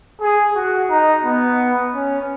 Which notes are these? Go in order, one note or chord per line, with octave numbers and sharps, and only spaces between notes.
G#4
F#4
D#4
B3
C#4